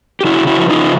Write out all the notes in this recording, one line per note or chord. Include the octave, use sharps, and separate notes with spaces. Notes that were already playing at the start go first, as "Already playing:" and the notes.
G4
C#3 E4 F#4
C#3
E4 F#4
F3
D#4 F4
C#3